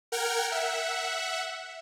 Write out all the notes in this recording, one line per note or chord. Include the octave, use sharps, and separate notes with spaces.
A#4 F#5 G5 F6 G#6
E5 F#5